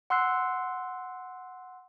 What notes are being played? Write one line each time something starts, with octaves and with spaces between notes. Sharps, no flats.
F#5 C6 E6 F#6 C7